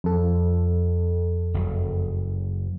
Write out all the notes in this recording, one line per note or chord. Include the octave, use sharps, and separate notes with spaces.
F2 A4
F#1